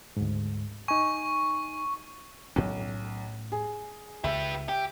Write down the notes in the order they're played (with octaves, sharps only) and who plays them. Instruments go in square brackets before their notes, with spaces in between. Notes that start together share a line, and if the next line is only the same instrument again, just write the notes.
[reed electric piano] D2 G#2
[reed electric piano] D#4 G#5 [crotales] C#6
[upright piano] B1 [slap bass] A2 C#4
[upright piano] G#4
[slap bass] C#2 [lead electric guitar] G4 B4 [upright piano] E5
[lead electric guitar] G4